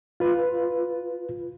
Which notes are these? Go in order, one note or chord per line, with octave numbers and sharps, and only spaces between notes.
F4 B4